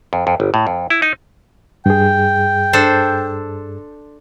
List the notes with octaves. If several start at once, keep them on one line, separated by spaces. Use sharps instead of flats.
F2
F2
G1
A2
F2
E4
D#4
G2 G#4 G5
D4 A4 C5